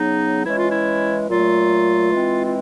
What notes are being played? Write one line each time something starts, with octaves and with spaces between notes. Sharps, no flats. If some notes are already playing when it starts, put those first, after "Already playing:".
Already playing: C#3 F#3 B3 D#4
E3 G#3 C#4 E4
F4
E4
A#2 F#3 A3 F4
E3 G#3 C4
F4